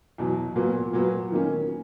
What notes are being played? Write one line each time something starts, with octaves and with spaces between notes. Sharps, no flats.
E2 B2 F#3
A#2 F#3 B3
A#2 F#3 B3
D#3 A#3 C#4